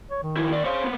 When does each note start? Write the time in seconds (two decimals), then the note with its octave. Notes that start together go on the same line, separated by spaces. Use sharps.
0.11 C#5
0.23 D#3
0.36 F3 E4
0.50 D#2 D5
0.65 C5 C#5 F5
0.84 A#3 B3